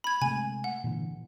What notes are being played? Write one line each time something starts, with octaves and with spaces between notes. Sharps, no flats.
B5 G#6
C3 G#3 A3 G#5
F#5
A#2 D3 E3